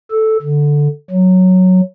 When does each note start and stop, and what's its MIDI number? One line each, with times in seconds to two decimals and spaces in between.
0.11 0.37 69
0.42 0.88 50
1.11 1.81 54